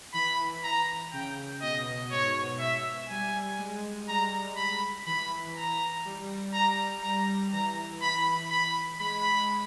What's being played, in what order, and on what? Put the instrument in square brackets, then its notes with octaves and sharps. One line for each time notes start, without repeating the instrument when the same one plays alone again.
[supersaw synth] E3 [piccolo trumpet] B5
[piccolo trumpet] A#5
[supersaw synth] C#3 [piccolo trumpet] G5
[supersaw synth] B2 [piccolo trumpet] D#5
[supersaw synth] G#2 [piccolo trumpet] C#5
[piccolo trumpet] E5
[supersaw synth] G3 [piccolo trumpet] G#5
[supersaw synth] G#3
[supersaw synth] G3 [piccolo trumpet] A#5
[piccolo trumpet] B5
[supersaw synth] E3 [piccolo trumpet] B5
[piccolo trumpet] A#5
[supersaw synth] G3
[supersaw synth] G3 [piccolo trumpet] A#5
[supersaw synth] G3 [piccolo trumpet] A#5
[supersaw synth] E3 [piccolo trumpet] A#5
[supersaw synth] E3 [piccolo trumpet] B5
[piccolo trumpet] B5
[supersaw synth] G#3 [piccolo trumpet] B5